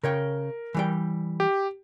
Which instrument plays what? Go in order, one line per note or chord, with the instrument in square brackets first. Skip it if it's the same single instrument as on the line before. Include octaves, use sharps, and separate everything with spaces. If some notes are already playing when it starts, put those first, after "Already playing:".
[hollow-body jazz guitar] C#3 C#5 G5 [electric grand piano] A#4
[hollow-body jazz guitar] E3 G3 G5
[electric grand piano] G4